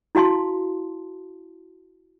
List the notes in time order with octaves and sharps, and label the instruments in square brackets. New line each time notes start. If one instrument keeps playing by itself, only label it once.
[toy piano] E4 F#4 F5 A5 C6